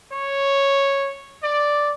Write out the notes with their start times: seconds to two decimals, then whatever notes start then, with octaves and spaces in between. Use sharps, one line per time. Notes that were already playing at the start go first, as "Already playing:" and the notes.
0.12 C#5
1.43 D5